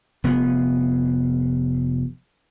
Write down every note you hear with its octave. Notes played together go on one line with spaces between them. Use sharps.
F1 B3